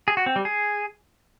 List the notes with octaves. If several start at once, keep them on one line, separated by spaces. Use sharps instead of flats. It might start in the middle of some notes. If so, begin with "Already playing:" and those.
G#4
F#4
C4
G3
G#4